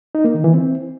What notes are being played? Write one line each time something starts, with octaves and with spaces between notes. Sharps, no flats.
D#4
A#3
D#3
E3
C4